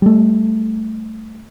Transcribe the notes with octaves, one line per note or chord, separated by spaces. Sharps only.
G3 A3